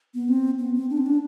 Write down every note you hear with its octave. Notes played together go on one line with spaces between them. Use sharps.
B3
C4
B3
C4
D4
C4
D4